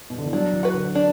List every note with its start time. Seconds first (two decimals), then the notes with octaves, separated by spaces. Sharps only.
0.10 B2
0.18 D3
0.26 E3
0.33 F#3 D4
0.53 E3
0.63 F#4 B4
0.74 D3
0.95 D4